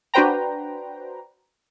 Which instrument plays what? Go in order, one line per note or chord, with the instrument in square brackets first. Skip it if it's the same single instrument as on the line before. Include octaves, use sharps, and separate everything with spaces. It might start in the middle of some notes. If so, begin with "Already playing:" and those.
[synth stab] D4 F#4 B4 C5 G5 A#5